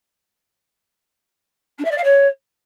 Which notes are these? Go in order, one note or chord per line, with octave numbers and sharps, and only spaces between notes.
D4
E5
D5
F5
C#5